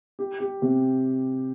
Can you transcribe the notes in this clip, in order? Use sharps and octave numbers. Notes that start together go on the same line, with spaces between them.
G4
G4
C3